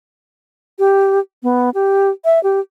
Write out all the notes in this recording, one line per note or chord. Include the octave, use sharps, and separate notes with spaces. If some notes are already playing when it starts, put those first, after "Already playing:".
G4
B3
G4
E5
G4